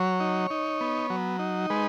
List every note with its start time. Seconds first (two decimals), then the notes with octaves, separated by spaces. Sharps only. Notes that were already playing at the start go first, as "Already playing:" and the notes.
Already playing: F#3 C#5
0.20 D#4
0.50 D#4
0.81 B3
1.10 F#3
1.39 D#4
1.70 G#3 B4